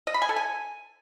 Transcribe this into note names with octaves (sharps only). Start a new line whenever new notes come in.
D#5
B5
G#5
A4
G#5